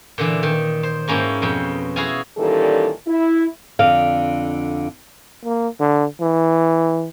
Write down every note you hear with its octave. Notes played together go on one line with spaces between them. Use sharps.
A#2 D3 E3
D#3
C5
G#2 A#3 C#4 E4 G5
F2 B2 G5
E4 F#4 G#4 F5 G#5
A#2 D#3 E3 G3 C#4 A4
E4
F2 D3 F5
A#3
D3
E3